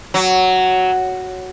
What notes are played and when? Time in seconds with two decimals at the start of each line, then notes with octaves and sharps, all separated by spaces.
0.14 F#3